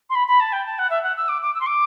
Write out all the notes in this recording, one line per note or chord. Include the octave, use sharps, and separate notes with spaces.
C6
B5
B5
A5
G5
A5
F#5
E5
F#5
E6
D6
D6
E6
C6
D6